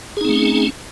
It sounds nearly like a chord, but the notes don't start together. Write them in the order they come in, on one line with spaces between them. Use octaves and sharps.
G#4 D#4 C4 A3 C#4